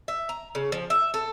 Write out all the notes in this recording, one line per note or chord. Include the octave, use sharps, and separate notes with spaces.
E5
A#5
C#3
F3
E5
A4